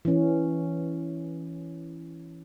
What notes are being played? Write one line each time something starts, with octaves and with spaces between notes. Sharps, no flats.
E3 C#4